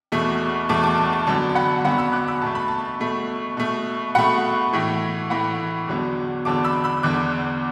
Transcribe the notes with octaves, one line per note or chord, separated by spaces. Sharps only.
E2 B2 A3
E2 B2 A3 A5 D6
A5 D6
A5
A5
F#2 D3 F#3 B3 A5
A5
F#5 B5
F#2 D3 F#3 B3 F#5 B5
B5 E6
D6 F#6
B5 E6
B2 A3 A5
B5
A5
B2 A3
B2 A3
B2 A3 F#5 B5
A2 E3 A3
A2 E3 A3 F#5 B5
E2 D3 F#3 B3
E2 D3 F#3 B3 A5 D6
B5 E6
B5 E6
E2 D3 B3 D6 F#6